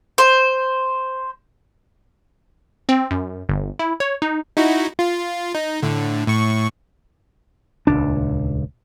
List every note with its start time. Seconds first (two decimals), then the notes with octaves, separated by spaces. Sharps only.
0.18 C5
2.89 C4
3.11 F#2
3.49 G1
3.79 E4
4.00 C#5
4.22 D#4
4.57 D#4 E4 F#4
4.99 F4
5.55 D#4
5.83 A2 D3
6.27 A2 C#6
7.87 D#1 C#2 D4